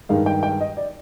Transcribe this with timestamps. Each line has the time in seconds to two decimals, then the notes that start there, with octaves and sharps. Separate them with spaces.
0.09 G2 D#3 G#3 D#4 F5
0.26 G5
0.43 G5
0.61 D#5
0.77 D5